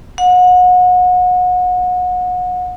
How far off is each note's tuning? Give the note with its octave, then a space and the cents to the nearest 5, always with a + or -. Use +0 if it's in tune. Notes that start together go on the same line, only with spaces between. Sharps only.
F#5 -30